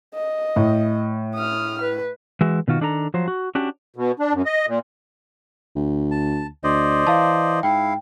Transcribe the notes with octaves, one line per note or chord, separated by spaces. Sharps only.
D#5
A2
D#6 F6
B4
E3 G#3 F#4 E5
B2 D#3 F4 F#4
D#3 D4 A4 D5 A#5
F3 F#3 C5
F#4
C#4 D4 F#4 G4
B2
D4
F#2
D#5
A#2
D2
A5
D2 C5 D5 D#5
E3 F5 A5
G#2 E4 F5 G5